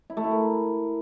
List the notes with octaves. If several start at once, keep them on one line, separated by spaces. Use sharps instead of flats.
E4
A3
E4
A#4